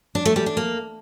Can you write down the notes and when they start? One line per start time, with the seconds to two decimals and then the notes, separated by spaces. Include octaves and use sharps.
0.15 D4
0.25 A3
0.36 G3
0.46 D4
0.57 A#3